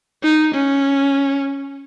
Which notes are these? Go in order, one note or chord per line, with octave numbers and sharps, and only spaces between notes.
D#4
C#4